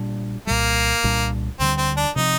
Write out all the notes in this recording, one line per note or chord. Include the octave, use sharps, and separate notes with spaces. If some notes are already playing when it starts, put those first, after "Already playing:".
Already playing: A#2 G3 D4
C2 A#2 G3 A#3
C2 A#2 G3 D4
D2 D3 G3 C4
C4
D4
C3 F3 C4 D#4